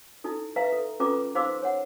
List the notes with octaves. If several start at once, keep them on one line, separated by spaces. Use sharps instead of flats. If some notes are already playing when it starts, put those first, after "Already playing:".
D#4 E4 A4
B4 E5 F5 A#5
A4
C#4 F4 A4 B4 A#5 D6
D#4 C5 F5 C6 D6 E6
C#5 F#5